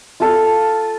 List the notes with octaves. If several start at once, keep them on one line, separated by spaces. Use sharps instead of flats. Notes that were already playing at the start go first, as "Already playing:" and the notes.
F4 A4 F5